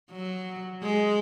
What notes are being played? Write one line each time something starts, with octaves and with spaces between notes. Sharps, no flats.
F#3
G#3